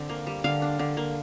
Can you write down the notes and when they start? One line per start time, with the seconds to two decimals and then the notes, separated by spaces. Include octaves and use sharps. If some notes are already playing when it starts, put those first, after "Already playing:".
Already playing: D3 C4
0.09 A#3
0.27 G3
0.44 D3 F5
0.62 D4
0.79 D3
0.97 A#3